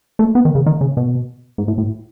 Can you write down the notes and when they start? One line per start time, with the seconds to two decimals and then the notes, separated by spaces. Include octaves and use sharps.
0.19 A3
0.35 B3
0.45 D#3
0.55 C#3
0.66 D#3
0.81 C#3
0.97 B2
1.58 G#2
1.68 A2
1.78 A2